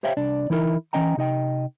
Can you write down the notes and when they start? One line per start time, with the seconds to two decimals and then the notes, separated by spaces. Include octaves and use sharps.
0.03 G4 C5 C#5 E5 F5 G5
0.17 C2 D4 D5
0.50 E3 D#4 E4 A#4 E5
0.93 E3 A#3 C#4 D#5 G5 A#5
1.17 C3 D#4 D#5 G5